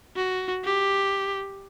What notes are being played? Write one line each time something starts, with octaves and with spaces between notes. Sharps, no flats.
F#4
G4